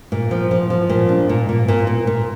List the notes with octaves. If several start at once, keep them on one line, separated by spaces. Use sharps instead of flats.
A#2
F3
F3
F3
A#2
D4
A#2
A#2
A#2
A#2
A#2